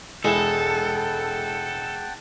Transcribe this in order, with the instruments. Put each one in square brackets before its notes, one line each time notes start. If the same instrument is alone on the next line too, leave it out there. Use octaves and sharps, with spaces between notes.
[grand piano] E1 E4 E7 [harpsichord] G#3 [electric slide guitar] A4 [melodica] F#5 G5 A5